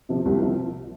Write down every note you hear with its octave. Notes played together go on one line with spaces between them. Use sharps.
C3 F3
C2
C3 F3